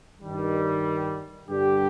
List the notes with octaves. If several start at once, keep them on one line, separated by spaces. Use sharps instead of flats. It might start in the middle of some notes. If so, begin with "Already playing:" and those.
G2 D#3 G3
G2 D3 G3 D4 G4